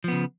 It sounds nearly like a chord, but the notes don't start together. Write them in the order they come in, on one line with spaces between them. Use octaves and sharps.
F3 B3 C#3